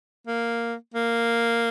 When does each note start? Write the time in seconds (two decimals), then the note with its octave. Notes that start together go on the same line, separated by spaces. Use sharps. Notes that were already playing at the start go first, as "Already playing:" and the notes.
0.27 A#3
0.94 A#3